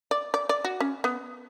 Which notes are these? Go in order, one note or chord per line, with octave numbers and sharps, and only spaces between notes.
D5
D5
D5
F#4
C#4
B3